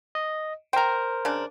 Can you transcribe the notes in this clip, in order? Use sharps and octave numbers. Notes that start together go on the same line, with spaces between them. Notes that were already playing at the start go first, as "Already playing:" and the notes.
D#5
A#4 C5 G5 A#5
C#3 D4